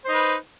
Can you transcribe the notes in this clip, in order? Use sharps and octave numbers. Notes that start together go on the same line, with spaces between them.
D#4 B4 C5